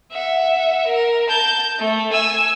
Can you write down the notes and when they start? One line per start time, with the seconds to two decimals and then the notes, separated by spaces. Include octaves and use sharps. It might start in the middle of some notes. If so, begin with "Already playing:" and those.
0.11 E5 F#5
0.87 A#4
1.28 A5 G6
1.79 A3
2.12 G#5 E6